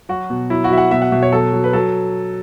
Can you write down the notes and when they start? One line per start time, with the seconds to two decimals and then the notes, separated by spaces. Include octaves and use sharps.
0.09 F#3 F#4
0.30 B2
0.50 F#3 E4
0.64 F#4
0.71 F#3 E5
0.78 F#5
0.91 B2 E5
1.02 F#5
1.12 B2 E5
1.23 C#5
1.33 F#3 A4
1.53 F#3
1.64 B4
1.73 F#3 A4